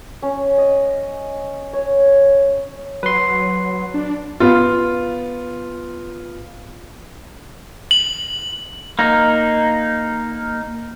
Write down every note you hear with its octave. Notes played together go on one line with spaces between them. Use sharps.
C#4
D#5
C#5
F#3 B4 C6
D4
B3 F4
F#7
A#3 D#4